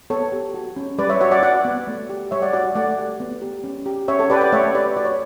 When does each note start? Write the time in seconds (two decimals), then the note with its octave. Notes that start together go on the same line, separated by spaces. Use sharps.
0.10 B3 A4 C#5
0.32 G4
0.54 F#4
0.76 C#4
0.98 G3 B4 D5
1.10 C#5 E5
1.21 F#4 C#5 E5
1.32 D5 F#5
1.42 F#4 D5 F#5
1.65 B3
1.87 A3
2.09 G4
2.31 G3 C#5 E5
2.42 D5 F#5
2.53 F#4 D5 F#5
2.75 A3 D5 F#5
2.98 G4
3.20 B3
3.42 G4
3.64 C#4
3.86 G4
4.08 C#4 C#5 E5
4.19 A4 C#5
4.30 G4 B4 D5
4.37 G5
4.41 D5 F#5
4.52 A3 C#5 E5
4.75 G4 B4 D5
4.97 F#4 D5
5.05 C#5